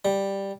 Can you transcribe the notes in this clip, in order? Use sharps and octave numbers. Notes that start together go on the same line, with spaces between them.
G3